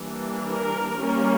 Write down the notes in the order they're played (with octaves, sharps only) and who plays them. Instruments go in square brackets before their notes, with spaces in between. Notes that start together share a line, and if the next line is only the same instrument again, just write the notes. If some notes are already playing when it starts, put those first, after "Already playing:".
Already playing: [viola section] E3 G3 A#3 D4
A#4
G3 A#3 C#4